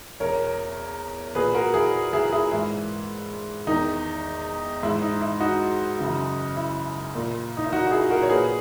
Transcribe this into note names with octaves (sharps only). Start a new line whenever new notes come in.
E2 B2 A#4 C#5
A#2 G#4 B4
F#4 A#4
E4 G#4
E4 G#4
E4 G#4
G#2 E3 E4
E2 D#3 D#4
G#2 E3 E4
D#4
E4
D#4 F#4
F#2 C#3 E3
E4
A#2
D#4
E4
D#4 F#4
F#4
E4 G#4
F#4 A#4
C#5
A#2 G#4 B4